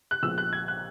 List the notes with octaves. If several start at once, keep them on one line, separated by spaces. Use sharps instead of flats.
F#6
A#1 A#2 G#3 B3 E6
F#6
G#6
F#6